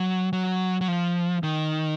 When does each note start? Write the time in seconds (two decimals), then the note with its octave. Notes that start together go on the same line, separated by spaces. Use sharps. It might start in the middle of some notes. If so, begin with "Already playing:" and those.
Already playing: F#3
0.33 F#3
0.81 F#3
0.88 F3
1.43 D#3